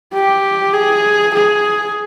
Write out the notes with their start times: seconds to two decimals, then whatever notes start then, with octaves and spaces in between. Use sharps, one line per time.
0.14 G4
0.73 G#4
1.34 G#4